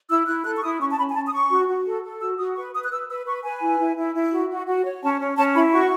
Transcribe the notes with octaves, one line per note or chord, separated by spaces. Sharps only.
E4 E6
E4 F#6
A4 F#6
C#6
E4 D#6
C#4 C#6
A5
C#4 B5
G#5
C#4 A5
D#6
C#4 C#6
F#4
F#4
A4
A4
F#4 E6
F#4 D#6
B4 C#6
B4 D#6
F#6
B4 E6
B4 E6
B4 C#6
B4 G#5
E4
E4
E4
E4
F#4
F#4
F#4
C#5
C#4 A5
C#4
C#4 A5
E4 B5
F#4 C#6